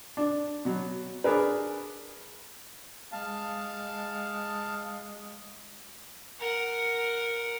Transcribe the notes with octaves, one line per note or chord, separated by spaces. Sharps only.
D4
B2 F#3
D4 G#4 A#4 B4
G#3 F5 A5
A#4 F#5